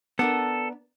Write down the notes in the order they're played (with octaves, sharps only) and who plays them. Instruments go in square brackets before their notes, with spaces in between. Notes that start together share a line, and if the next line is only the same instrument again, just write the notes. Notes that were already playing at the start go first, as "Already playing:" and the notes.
[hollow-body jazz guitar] B3 D4 A#4 [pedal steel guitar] A4